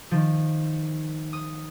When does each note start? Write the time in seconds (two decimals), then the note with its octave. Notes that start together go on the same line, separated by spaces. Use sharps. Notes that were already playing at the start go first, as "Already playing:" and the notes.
0.11 D#3 F3
1.33 D#6